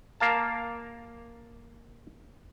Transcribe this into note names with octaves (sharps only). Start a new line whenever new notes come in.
A#3 F5 A5